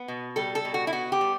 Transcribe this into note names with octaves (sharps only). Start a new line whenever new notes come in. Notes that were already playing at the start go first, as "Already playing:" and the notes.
Already playing: B3
B2
G3 A4
A4
B2
F#4
E4
B3 F#4
G4
G3